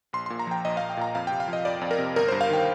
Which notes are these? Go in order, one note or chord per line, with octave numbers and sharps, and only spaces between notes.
A#1 C6
C6
A#2
A#5
F3 G5
A#1 D#5
A#1 F5
G5
A#2 A#5
F2 F5
G5
C3
F5
F3
D#5
F2 D5
F2
A#4
C3
G1 A#4
G2 C5
F5
D#3 G5